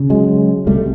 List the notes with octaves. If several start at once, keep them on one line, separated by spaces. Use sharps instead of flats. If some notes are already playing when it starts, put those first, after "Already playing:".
Already playing: C#3
F#3 G#3
C2 C3 G3 A3